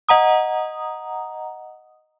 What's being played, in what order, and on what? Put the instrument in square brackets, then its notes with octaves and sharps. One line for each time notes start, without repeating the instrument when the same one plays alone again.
[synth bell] D#5 F#5 A#5 D#6